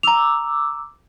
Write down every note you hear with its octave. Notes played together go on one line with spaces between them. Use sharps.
A#5 D6 E6 F7